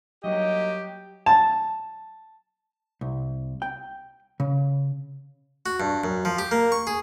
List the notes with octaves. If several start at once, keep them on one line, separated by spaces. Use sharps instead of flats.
F#3 G3 A#3 F#4 G4 C#5 D#5
A5
C2
G5
C#3
F#4
G2
F#2
F3
G4
A#3
C#6
G#4